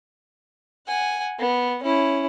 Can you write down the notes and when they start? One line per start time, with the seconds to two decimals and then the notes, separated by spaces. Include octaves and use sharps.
0.88 F#5 G#5
1.39 B3
1.83 C#4 E4